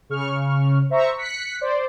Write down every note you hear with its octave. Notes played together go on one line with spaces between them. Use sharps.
C#3 C#6 F6
C5 E5 A#5 C#6
F#6 B6 C#7
C5 D5